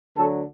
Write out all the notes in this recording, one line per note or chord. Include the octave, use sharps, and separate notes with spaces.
D2 D3 F#3 A4